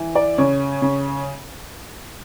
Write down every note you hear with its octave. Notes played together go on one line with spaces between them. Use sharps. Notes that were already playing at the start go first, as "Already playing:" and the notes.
Already playing: E3
D5
C#3 C#5
C#3